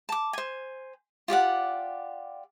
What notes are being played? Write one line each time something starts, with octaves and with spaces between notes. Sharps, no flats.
A5 D6
C5 G#5
F4 G4 D5 F#5